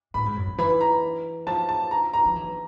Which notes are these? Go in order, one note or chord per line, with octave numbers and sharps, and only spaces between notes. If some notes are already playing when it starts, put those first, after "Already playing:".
A2 B5
G#2
F#2
C3
E3 B5
A#5
F3 A5
A5
A#5
A#5
F3
E3